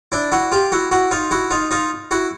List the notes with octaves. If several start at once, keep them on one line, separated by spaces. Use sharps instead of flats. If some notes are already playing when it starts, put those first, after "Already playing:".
D4 E4
E4 F#4
F4 G4
E4 F#4
E4 F#4
D#4 F4
E4 F#4
D#4 F4
D#4 F4
E4 F#4